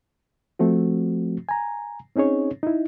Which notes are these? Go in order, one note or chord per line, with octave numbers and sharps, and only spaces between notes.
F3 A3 C4 F#4
G#5 A#5
C4 C#4 D#4 G#4 C#5
D#4 E4